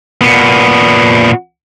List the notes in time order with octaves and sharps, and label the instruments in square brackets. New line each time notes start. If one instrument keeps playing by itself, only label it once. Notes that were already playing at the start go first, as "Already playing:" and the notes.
[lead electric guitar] A#2 B3